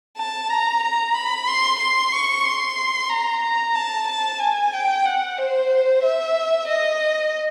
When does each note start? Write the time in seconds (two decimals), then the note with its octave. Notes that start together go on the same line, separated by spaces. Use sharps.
0.17 A5
0.49 A#5
0.82 A#5
1.14 B5
1.47 C6
1.79 C6
2.12 C#6
2.45 C6
3.09 A#5
3.42 A#5
3.74 A5
4.08 A5
4.40 G#5
4.73 G5
5.05 F#5
5.38 C5
6.03 E5
6.68 D#5